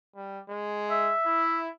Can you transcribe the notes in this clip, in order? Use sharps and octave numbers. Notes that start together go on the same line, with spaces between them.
G3
G#3
E5
E4